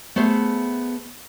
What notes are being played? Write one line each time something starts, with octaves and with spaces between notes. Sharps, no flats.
A3 B3 G#4 C5